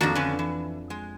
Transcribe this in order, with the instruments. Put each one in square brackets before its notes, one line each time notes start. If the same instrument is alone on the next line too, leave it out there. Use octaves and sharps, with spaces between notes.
[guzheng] F2 F3 D4 [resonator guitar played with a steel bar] D#3 A#3 F#4
[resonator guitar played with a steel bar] D3 C#4 [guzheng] B4
[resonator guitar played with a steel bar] E3
G#3